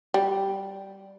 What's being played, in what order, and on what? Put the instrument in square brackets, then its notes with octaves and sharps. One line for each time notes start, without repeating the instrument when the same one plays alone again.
[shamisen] G3